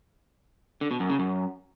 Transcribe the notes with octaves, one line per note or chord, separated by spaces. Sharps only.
D3
B2
F#2
C#3
F#2